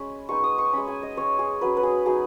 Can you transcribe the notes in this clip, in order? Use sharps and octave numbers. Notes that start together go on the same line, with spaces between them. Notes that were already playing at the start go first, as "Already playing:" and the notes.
Already playing: G#3 C#4 B5
G#3 B3 D#4 C#6
D#6
C#6
G#3 C#4 B5
G#5
D#5
G#3 C#4 C#5
G#4
F#3 C#4 B4
B4
G#4
F#3 D#4 G#4